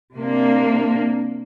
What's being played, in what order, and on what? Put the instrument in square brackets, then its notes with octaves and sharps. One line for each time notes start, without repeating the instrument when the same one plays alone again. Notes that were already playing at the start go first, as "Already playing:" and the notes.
[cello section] C3 A#3 D4